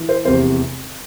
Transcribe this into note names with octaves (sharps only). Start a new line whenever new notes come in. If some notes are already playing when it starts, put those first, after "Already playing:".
Already playing: E3
C5
F1 E2 C3 C5